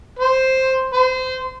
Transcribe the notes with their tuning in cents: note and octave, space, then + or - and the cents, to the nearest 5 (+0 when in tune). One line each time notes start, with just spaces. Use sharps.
C5 +5
C5 -25